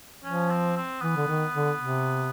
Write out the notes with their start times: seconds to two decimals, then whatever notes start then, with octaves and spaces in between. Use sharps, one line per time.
0.24 F3 C#4
0.50 C4
0.77 C4
1.01 E3 B3
1.16 D3
1.27 D#3
1.53 D3
1.79 C3